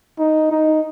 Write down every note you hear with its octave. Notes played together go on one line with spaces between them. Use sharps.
D#4
D#4